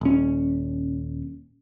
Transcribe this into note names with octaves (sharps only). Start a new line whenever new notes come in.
D#1 C#4